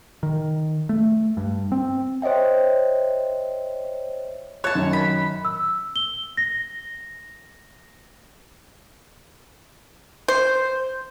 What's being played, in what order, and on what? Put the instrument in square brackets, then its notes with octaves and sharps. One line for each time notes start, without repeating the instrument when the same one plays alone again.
[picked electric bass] D#3
A3
G2
C4
[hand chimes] C5 C#5 D#5 E5 G5
[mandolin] C#5 A5 [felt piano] F#6
[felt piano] F#2 D#3
[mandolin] B5
[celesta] E6
G7
A#6
[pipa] C5